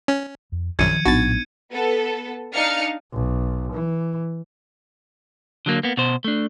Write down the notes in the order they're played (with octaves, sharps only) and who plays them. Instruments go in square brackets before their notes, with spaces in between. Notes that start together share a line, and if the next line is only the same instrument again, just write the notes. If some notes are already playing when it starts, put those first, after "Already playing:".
[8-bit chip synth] C#4
[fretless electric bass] F2
[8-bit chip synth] A#1 F#2 [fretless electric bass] D#3 F3 [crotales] G#6 C#7 D#7
[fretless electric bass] A#1 A2 F#3 [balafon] B3 D4 D#4 [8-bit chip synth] F#4 A6
[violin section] B3 A4
D4 D#4 F5 F6 C#7
[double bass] B1
E3
[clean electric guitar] D3 F#3 A#3
A#3 B3
B2 C5
A3 D4